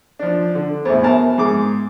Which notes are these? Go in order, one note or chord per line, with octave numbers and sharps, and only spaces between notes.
F3 D4
D3
E2 A2 C5 E5
B2 B3 A#4 E5 A5
G#2 G#4 D6